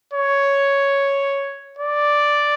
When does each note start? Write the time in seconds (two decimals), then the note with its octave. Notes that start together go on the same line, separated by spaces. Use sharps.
0.14 C#5
1.79 D5